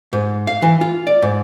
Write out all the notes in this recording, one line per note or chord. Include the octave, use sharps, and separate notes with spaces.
G#2
F5
E3
F4
D5
G#2